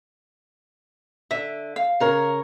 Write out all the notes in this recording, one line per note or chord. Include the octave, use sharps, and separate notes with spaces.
D3 E5
F5
C#3 A#4 C#5